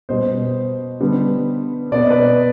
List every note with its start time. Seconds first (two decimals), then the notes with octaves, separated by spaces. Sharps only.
0.09 B2 G3 B3 C5 D#5
1.00 D3 G3 B3
1.92 B2 B3 D5
2.02 D#5
2.10 B4 D5